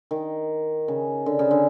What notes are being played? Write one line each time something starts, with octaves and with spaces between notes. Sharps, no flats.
D#3
C#3
D3
C#3
D3